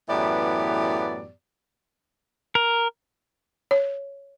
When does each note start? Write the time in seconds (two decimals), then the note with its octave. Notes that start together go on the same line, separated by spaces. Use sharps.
0.09 F#2 A2 E3 B3 G4 D5
2.55 A#4
3.71 C#5